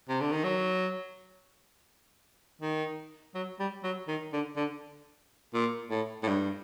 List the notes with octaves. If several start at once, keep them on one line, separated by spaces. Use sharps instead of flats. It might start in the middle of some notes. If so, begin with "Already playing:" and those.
C3
D3
D#3
F#3
D#3
F#3
G3
F#3
D#3
D3
D3
A#2
A2
A2
G2